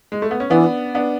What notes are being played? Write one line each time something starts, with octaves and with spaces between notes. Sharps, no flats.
G#3
A3
B3
C#4
E3 B3 D4
B3 D4